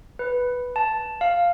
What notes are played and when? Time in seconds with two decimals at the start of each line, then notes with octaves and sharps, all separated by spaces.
0.19 B4
0.76 A5
1.21 F5